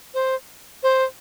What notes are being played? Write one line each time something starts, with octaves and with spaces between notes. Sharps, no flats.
C5
C5